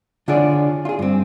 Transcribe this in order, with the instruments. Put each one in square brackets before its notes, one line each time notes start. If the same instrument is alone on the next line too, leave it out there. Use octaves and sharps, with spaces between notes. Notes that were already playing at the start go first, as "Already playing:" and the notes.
[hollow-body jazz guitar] D3 D4 F4 G#4 C#5 D5
F4 G#4
G2 C4